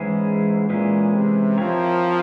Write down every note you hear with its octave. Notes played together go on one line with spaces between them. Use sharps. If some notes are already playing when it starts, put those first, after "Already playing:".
Already playing: G#2 E3 G#3 C#4 E4 G#4
A#2 E3 G#3 C#4 E4 G#4
C3
F3 C4 E4 A#4 C#5